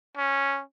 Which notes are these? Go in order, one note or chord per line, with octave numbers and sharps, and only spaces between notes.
C#4